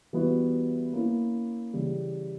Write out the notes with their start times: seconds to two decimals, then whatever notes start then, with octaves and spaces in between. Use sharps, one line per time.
0.13 E3 G3 B3 F#4 B4
0.93 A#3 C#4 E4
1.74 C#3 E3 G3